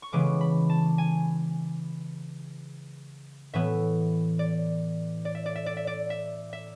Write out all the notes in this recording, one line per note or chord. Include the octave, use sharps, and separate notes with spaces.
C#6
C#3 E3 G#3 B3 D6
B5
A5
G#5
A2 E3 B3 E5
D5
D5
E5
D5
E5
D5
E5
D5
E5
E5